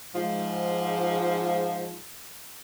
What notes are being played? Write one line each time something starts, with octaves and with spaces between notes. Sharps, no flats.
G#2 F3